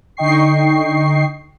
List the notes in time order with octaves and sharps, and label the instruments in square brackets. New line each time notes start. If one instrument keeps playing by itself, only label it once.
[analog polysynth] D3 D#4 D#5 G5 C#6 C7